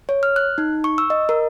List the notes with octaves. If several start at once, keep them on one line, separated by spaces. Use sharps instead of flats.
C#5
F6
F#6
D#4
C#6
E6
D#5
A#4